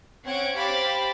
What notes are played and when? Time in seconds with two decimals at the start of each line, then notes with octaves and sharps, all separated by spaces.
0.24 C4 C#4 F#5 G#6 D7
0.57 G4 C5 F5 B5 D6 A6